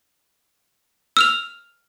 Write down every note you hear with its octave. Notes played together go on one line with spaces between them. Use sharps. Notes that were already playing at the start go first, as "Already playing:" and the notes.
E6 F6 F7